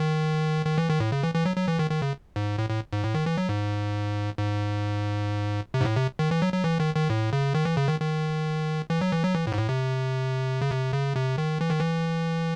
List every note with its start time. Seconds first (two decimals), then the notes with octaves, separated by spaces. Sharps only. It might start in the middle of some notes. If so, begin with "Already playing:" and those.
Already playing: D#3
0.66 D#3
0.78 E3
0.89 D#3
1.00 A2
1.12 C#3
1.23 E3
1.34 E3
1.45 F#3
1.56 F#3
1.68 E3
1.79 D#3
1.91 D#3
2.02 C#3
2.36 G#2
2.58 A2
2.70 A2
2.93 G#2
3.04 A2
3.14 D#3
3.26 E3
3.38 F#3
3.49 G#2
4.39 G#2
5.74 C3
5.81 G#2
5.85 A2
5.97 C3
6.19 D#3
6.31 E3
6.42 F#3
6.53 F#3
6.64 E3
6.80 D#3
6.95 D#3
7.10 A2
7.33 C#3
7.54 D#3
7.65 E3
7.77 C#3
7.88 D#3
8.00 D#3
8.90 E3
9.01 F#3
9.13 E3
9.24 F#3
9.35 E3
9.47 A2
9.52 G#2
9.58 A2
9.69 C3
10.61 C#3
10.71 C3
10.93 C#3
11.16 C3
11.38 D#3
11.61 E3
11.71 D#3
11.80 E3